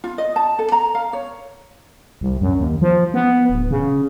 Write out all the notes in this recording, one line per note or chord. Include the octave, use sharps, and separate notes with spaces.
F4
D#5
A5
A4
A#5
F5
C#5
C2
F#2
D#2
F3
B3
D1
C#3